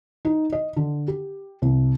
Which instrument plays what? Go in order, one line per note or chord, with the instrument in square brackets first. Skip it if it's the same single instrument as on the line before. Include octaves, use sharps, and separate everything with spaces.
[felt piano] D#4
D#5
D3
G4
C2